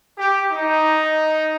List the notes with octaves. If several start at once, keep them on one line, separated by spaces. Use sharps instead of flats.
G4
D#4